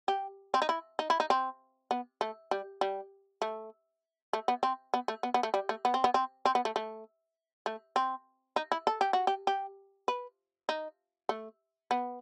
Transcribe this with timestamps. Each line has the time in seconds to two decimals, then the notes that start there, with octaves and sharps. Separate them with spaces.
0.08 G4
0.54 C4
0.62 D#4
0.69 E4
0.99 D#4
1.10 E4
1.20 D#4
1.30 C4
1.91 B3
2.21 A3
2.51 G3
2.81 G3
3.42 A3
4.33 A3
4.48 B3
4.63 C4
4.94 B3
5.08 A3
5.23 B3
5.34 B3
5.43 A3
5.54 G3
5.69 A3
5.85 B3
5.94 C4
6.04 B3
6.14 C4
6.45 C4
6.55 B3
6.65 A3
6.76 A3
7.66 A3
7.96 C4
8.56 D#4
8.72 E4
8.87 A4
9.01 G4
9.13 F#4
9.27 G4
9.47 G4
10.08 B4
10.69 D#4
11.29 A3
11.91 B3